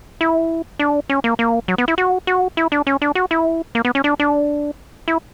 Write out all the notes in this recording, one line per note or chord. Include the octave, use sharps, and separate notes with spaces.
E4
D4
C#4
A#3
A#3
F#3
B3
E4
F#4
F#4
E4
D4
C#4
D4
F#4
E4
A#3
B3
C#4
D4
D4
E4